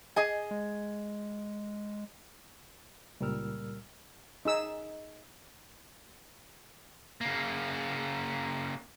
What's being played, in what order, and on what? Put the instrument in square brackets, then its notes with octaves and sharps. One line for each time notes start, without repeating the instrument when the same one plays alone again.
[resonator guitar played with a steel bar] G#4 D#5 G#5
[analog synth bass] G#3
[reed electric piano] C#2 A#2 G3 A#4 E6 F6
[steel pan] D#4 G#4 E6
[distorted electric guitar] C#3 A#3